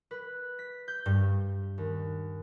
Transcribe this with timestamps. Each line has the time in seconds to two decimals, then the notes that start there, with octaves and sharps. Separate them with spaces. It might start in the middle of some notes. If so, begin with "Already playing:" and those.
0.11 B4
0.59 B6
0.88 G6
1.06 G2
1.78 D#2